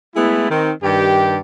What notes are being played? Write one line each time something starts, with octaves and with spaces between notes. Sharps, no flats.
G#3 A3 B3 E4
D#3 C4
G2 D#3 G4